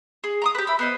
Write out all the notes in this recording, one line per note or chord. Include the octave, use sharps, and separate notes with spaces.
G#4
A#5 C6 D#6
G4 B4
E4 B5
B3 C5 D#5